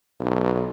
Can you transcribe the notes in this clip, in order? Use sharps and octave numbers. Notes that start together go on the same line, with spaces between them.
B1